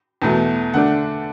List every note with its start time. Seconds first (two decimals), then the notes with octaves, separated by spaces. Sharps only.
0.22 E2 B2 A3
0.74 D3 A3 D4 F#5